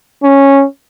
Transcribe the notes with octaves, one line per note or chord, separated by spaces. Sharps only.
C#4